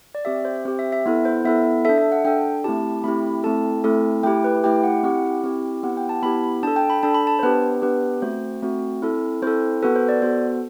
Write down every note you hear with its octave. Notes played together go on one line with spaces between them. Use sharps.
D5
C4 G4 E5
C5
C4 G4 C5
E5
E5
B3 E4 A4
C5
B3 E4 A4 E5
D4 A4 E5
E5
F#5
D4 A4 G5
A3 C4 E4 G4 A5
A3 C4 E4 G4 B5
A3 C4 E4 A4 A5
A3 C4 E4 A4
A3 E4 G4 G5
B4
A3 E4 G4 G5
F#5
C4 E4 G4 F#5
C4 E4 G4
B3 E4 G4 F#5
G5
A5
B3 E4 G4 B5
D4 A4 A5
G5
B5
D4 A4 A5
B5
A5
C5
B3 D4 G4 B4
B3 D4 G4 B4
A3 C4 F#4 C5
A3 C4 F#4
C4 E4 A4
C4 E4 A4 C5
B3 F#4 A4 B4
C5
D5
B3 F#4 A4 C5